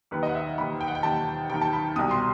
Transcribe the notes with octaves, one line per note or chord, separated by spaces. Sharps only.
D#2 D#3 B4
D#5
F#5
E5
D#2 D#3 B5
G5
F#5
G5
D#2 D#3 A5
D#2 D#3 G5
A5
B5
C2 B2 D#6
C6